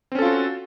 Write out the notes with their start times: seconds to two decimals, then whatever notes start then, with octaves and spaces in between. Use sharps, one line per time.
0.12 C4
0.15 C#4
0.19 A4
0.22 F4
0.25 F#4